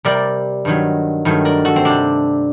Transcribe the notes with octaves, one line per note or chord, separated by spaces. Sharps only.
C3 G3 A#4 D5
G2 D#3 F#3
G2 D#3 F#3 A3
A#4 D5
F#4 A4
C4
C3 G3 D4